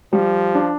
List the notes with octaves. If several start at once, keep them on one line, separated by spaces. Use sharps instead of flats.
F3 G3
D4